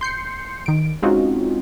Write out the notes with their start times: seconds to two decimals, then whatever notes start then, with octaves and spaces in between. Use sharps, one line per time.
0.01 C6 G6 C7 C#7
0.66 D#3 D7
1.02 G#3 C4 C#4 D#4 F4 F#4